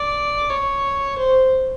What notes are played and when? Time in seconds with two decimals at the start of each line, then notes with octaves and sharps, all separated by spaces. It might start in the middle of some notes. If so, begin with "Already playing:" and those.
Already playing: D5
0.50 C#5
1.18 C5